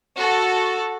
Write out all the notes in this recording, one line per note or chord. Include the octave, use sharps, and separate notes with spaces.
F#4 A4